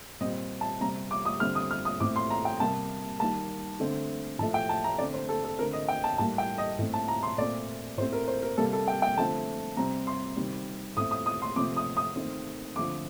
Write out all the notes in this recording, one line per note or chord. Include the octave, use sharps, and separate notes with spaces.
A#2 G3 C4 D#5
A5
C3 G3 C4 A#5
D6
D#6
D3 G3 C4 F6
D#6
F6
D#6
A2 A3 C4 D6
C6
A#5
G5
C3 G3 A#3 A5
D#3 G3 A#3 A5
D3 A3 C4
A2 F3 A3 A5
G5
A5
A#5
D3 A3 C4 D5
C5
A4
A4
D3 A3 C4 A#4
D#5
G5
A5
A2 G3 A#3 A5
G5
D#5
A2 A3 C4
A5
A#5
C6
A#2 A3 C4 D5
A2 A3 C4 C5
A#4
C5
A#4
C3 G3 A#3 A4
A4
G5
G5
D3 F3 A3 C4 A5
C3 G3 C4 A#5
C6
C3 D#3 G3 C4
A2 A3 C4 D#6
D#6
D#6
C6
C3 F3 A3 C4 D6
D#6
D#6
D#3 A3 C4
D3 F3 A3 C4 D6